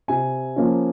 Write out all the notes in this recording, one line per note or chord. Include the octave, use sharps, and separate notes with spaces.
C3 G#5
F3 A#3 C#4